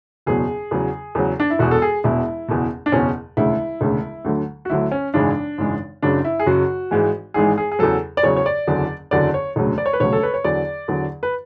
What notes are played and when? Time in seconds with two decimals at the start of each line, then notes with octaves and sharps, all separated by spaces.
0.26 F#1 E2 B2 F#3 G#4
0.71 E2 C#3 F#3
1.15 E2 C#3 F#3
1.40 D4
1.50 E4
1.59 E1 E2 B2 F#4
1.71 A4
1.82 G#4
2.04 E1 E2 B2 E4
2.48 F#1 E2 B2
2.86 D4
2.92 F#1 E2 B2 C#4
3.37 E1 D2 C#3 E4
3.81 E1 D2 C#3
4.25 D2 D3 F#3
4.65 F#4
4.70 D2 D3 F#3 E4
4.92 C#4
5.14 G#1 F#2 C#3 E3 G#3 D4
5.58 G#1 F#2 C#3 E3 G#3
6.02 F#1 F#2 C#3 F#3 D4
6.25 E4
6.40 G#4
6.46 F#1 F#2 C#3 F#3 F#4
6.91 G#1 G#2 E3 G#3
7.34 G#1 G#2 E3 G#3 G#4
7.58 G#4
7.72 G#4
7.79 E2 C#3 F#3 A4
8.17 D5
8.23 E2 C#3 F#3 C#5
8.37 C#5
8.46 D5
8.67 F#1 E2 D3 F#3
9.11 F#1 E2 D3 F#3 D5
9.34 C#5
9.56 E1 D2 C#3 F#3
9.78 D5
9.86 C#5
9.93 B4
10.00 E1 D2 C#3 F#3 C#5
10.13 A4
10.23 B4
10.34 C#5
10.44 E2 D3 F#3 D5
10.88 E2 D3 F#3
11.23 B4